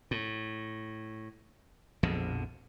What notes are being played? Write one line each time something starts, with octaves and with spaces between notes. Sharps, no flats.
A2
A#1 F2 B2 D3